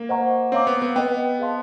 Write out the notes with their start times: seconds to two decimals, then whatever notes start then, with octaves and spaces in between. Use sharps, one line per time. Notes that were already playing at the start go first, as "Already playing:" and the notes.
Already playing: A#3
0.09 C5 D#5 F#5 A#5 C#6
0.52 C4 C#5 F5 A#5 D6
0.67 B3
0.82 B3
0.96 B3 B4 D#5 G5
1.39 G#4 C5 F5 A5 C6